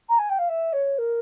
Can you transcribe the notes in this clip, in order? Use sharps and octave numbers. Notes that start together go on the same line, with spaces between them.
A#5
G#5
G5
F5
E5
C#5
A#4